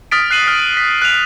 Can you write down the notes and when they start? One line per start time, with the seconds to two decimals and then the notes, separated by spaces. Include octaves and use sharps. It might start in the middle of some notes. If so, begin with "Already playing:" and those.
0.11 D#6 F6 A6 B6 D7
0.30 F#6 C7 D#7 F#7
0.47 F6 B6
0.77 B6
1.02 F#6 F7